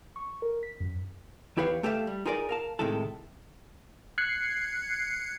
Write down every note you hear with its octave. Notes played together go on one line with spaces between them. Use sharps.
C#6
A#4
B6
F#2
E2 E4 G4 B4 C#5 F5
A3 G4 A4 C5 E5 F5
G3
D#4 F4 G#4 A#4 B4 D5
A#4 F5 A5
A2 C3 D#3 G#3 E4 A4
F#6 G#6 C7 C#7